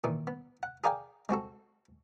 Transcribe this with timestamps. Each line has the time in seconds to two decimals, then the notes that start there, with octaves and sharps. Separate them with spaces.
0.04 A#2 D#3 E3
0.27 B3
0.63 F#5
0.84 G#4 A#4 D5 F5 G5 G#5
1.29 G#3 C4 F#4 A4